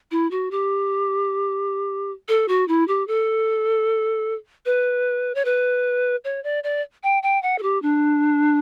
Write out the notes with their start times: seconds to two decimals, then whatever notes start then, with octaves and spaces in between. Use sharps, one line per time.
0.11 E4
0.31 F#4
0.51 G4
2.28 A4
2.48 F#4
2.68 E4
2.88 G4
3.08 A4
4.66 B4
5.35 C#5
5.45 B4
6.24 C#5
6.44 D5
6.64 D5
7.03 G5
7.23 G5
7.43 F#5
7.58 A4
7.63 G4
7.82 D4